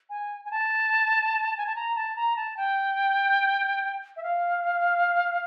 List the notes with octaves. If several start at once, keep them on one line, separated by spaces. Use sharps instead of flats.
G#5
G#5
A5
G#5
A5
A#5
A5
A#5
A5
G5
E5
F5